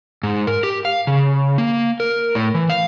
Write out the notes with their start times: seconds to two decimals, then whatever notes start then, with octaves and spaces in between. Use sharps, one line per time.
0.23 G#2
0.47 A#4
0.63 G4
0.85 F5
1.07 C#3
1.58 A#3
2.00 A#4
2.35 A2
2.54 E3
2.70 F5